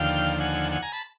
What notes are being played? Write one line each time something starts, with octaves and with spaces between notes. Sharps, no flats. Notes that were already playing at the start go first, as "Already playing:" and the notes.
Already playing: D#2 D3 F3 F5 G5
F#5 G#5
F#5 G#5
G#5 A#5
A5 B5